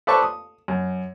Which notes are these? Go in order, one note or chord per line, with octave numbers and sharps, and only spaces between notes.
A4 B4 C5 D5 A5 C#6
D#6
F#2